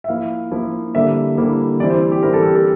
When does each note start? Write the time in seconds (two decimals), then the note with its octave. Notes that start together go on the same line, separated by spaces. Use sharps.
0.04 E5
0.08 F3 A#3 E4 F5
0.51 F3 A#3 E4
0.95 D3 G3 A#3 E4 E5
1.37 D3 G3 A#3 E4
1.80 E3 G3 C4 E4 D5
1.90 C5
2.12 G4
2.23 E3 G3 C4 E4 A#4
2.33 A4
2.44 G4
2.55 A4